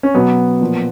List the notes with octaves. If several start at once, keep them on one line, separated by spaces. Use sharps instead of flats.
C#4
B2 F#3 B3
A#2 F3